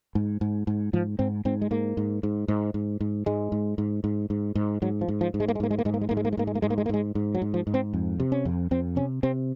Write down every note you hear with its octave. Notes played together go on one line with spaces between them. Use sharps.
G#2
G#2
G#2
G#2 F3
G#2 C4
G#2 C4
G#3
G#2 A#3
G#2
G#2
G#2
G#2
G#2
G#2 G#3
G#2
G#2
G#2
G#2
G#2
G#2 F#3
F3
G#2
F3
G#2
G#3
A#3
G#3
G#2 A#3
G#3
A#3
G#2 G#3
A#3
G#3
G#2 A#3
G#3
A#3
G#3
G#2 A#3
G#3
A#3
G#2 G#3
A#3
G#3
A#3
G#2 G#3
G#2
F#3
G#2
F3
G#2
C4
F2
C3
C#4
F2
F2 C4
C3 C#4
C3 C4